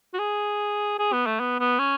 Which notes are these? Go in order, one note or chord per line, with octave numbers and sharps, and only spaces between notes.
F#4
G#4
G#4
B3
A3
B3
B3
C#4